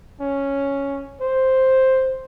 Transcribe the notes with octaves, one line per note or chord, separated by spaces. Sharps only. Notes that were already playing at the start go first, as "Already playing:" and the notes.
C#4
C5